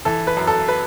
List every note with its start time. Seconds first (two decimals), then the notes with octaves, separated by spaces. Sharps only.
0.05 E3 A4
0.27 B4
0.37 F#2
0.47 A4
0.68 B4